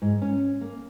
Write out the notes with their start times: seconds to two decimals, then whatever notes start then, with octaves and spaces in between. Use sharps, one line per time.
0.02 G#2
0.22 C#4
0.61 A#3